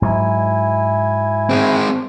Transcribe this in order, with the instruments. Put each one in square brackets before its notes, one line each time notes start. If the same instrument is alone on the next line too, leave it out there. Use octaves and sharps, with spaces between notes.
[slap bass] G#2 F#3 [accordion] E4 G#5
[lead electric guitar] G#3 C4